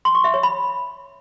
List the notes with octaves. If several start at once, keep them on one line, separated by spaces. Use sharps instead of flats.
C6
C#6
E5
C#5
B5